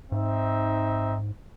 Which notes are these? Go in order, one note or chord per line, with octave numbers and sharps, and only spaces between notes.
G#2 C4 D#4 E5